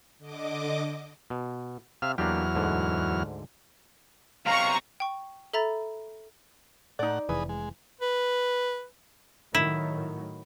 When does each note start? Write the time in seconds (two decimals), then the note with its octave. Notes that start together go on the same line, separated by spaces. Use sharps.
0.18 D3 D#5 D6
1.30 B2
2.02 C3 E5 F5 F6
2.18 E2 F#3 A#3 D4 G4 F6
2.55 D2 G#2 D3
4.46 B1 C3 F5 A#5 C#6
5.00 G5 C#6
5.53 A4 E5 A#5 B5 A6
6.99 A2 D#4 D5 F#5
7.29 F1 E3 G#4 B4 D#6
7.49 G#3
8.01 B4
9.55 A2 D#3 F#3 E4